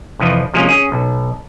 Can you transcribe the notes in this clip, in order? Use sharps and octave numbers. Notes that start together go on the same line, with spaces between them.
C2 F2 E3 F3
C3 F3 G#3 A#3 C#4
C#4 G#4
B1